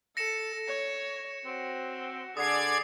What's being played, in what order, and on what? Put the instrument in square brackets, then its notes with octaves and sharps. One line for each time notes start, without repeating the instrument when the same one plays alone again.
[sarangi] A4 [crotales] A#6 C#7 E7
[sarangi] C#5
[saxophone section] C4 [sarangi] F#4
[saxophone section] D3 [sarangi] G#4 [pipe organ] D5 G#6 [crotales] D#6 C7